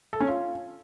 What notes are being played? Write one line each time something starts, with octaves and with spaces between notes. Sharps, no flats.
A4
C#4
F4